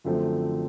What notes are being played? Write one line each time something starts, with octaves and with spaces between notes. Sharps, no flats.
F#2 D3 F3 A3 C4